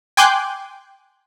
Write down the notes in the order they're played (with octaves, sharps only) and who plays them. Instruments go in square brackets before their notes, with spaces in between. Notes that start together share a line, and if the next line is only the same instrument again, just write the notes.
[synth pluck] G5 G#5 C6 D6 F#6 G6